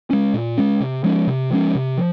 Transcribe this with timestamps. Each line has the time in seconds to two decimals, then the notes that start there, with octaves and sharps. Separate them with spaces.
0.10 G#3 C#4
0.34 A#2
0.58 G#3 C#4
0.80 C3
1.04 F3 G#3 C#4
1.27 C3
1.51 F3 G#3 C#4
1.75 C3
1.97 F3